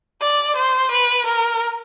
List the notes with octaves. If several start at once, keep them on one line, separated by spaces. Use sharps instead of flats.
D5
C5
B4
A#4